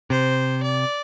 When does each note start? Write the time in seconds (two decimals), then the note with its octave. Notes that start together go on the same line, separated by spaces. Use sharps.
0.10 C3 C5
0.63 D5